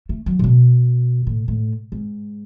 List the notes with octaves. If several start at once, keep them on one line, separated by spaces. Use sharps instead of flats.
A3
F#3
A2
B2
A2
A2
G#2